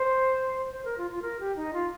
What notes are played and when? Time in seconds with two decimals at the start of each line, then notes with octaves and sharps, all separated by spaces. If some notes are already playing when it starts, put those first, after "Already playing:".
Already playing: C5
0.72 C5
0.85 A#4
0.98 F4
1.11 F4
1.22 A#4
1.40 G4
1.56 D#4
1.73 F4